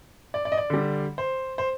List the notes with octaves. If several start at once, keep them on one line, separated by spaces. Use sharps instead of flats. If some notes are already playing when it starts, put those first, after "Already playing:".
D5
D5
D#5
D5
D3 G3
C5
C5